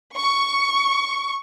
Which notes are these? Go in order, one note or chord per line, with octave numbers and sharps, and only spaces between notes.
C#6